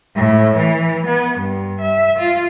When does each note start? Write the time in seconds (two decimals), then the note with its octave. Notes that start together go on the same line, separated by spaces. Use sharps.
0.15 A2
0.56 E3
1.06 B3
1.39 G2
1.81 E5
2.19 F4